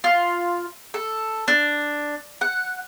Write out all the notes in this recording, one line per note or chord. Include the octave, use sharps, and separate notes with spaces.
F4
A4
D4
F#5